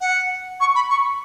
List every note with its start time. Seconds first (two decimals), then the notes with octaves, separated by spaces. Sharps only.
0.01 F#5
0.61 C#6
0.75 B5
0.90 C#6